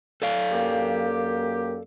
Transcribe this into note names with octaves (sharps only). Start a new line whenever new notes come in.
A4 D5 F5
F#2 A#3 G4